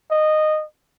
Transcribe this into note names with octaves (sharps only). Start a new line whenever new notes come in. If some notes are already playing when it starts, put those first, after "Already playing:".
D#5